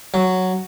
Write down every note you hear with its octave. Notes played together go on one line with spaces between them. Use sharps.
F#3